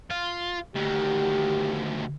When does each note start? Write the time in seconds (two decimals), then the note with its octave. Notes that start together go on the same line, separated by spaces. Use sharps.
0.10 F4
0.75 D2 D#3 G4